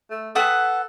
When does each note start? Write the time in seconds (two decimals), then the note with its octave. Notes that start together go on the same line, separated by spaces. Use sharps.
0.10 A3
0.35 A4 B4 F#5 D#6